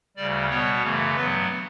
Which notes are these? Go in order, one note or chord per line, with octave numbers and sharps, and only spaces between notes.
D2 C#3 G3 D5
B2 G3 B3 C#5
F#2 C#3 E3 A3
G2 F#3 B3 B4